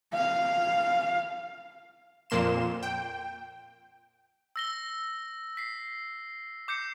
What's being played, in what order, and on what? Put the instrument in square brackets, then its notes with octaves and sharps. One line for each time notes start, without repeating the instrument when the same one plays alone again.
[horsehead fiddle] F5
[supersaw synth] F2 A#2 A#3 C6 E7
G5
[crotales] E6 A#6 G7
B6 C7
D6 G6 C7 C#7